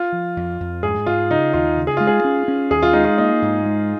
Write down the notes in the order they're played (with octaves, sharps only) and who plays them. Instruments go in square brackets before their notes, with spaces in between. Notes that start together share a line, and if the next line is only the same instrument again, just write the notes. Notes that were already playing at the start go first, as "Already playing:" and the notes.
Already playing: [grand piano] F4
[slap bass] F3
F2
F2
[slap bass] G#2 [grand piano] G#4
[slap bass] G#2 [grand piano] F4
[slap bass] C#3 [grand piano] D#4
[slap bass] D#2 [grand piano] F4
[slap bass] C#3
[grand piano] G#4
[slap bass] G#3 [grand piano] F4
[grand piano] G#4
[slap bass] C#4
C#4
[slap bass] D#2 [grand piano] G#4
[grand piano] F4
[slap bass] G#3 [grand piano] D#4
[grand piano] F4
[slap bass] A#3 [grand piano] D#4
[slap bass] G#2
G#3